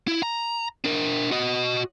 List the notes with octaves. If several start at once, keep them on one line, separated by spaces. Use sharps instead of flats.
E4
A#5
D4 A#4
F#4 D#5